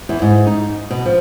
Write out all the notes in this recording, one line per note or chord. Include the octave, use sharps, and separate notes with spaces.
E2
G#2
D#4
B2
F3